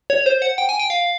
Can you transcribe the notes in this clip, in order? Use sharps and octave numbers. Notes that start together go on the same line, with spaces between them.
C#5
C5
F#5
G5
G#5
G5
F5